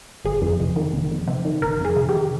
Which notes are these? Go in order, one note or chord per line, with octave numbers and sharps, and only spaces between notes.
G1 G#4
F2
C3
D#3
G1
F2
C3
D#3
G1 A#4
F2
G#4
C3
G4
D#3